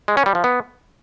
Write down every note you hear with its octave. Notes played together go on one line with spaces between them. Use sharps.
G#3
C#4
G3
F3
B3